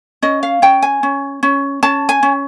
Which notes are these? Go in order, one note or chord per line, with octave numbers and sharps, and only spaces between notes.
C#4 D#5
F5
C#4 G5
G#5
C#4
C#4
C#4 A5
G#5
C#4